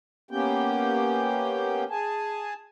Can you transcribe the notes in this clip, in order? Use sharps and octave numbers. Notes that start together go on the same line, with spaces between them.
A#3 B3 C#4 G4 G5
G#4 G#5 A5